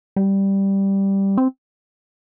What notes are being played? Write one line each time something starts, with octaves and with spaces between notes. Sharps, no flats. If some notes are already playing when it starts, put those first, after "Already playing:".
G3
C4